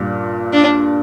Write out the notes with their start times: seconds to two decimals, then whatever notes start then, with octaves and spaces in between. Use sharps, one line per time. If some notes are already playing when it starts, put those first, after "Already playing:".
Already playing: G2 A#2
0.53 D4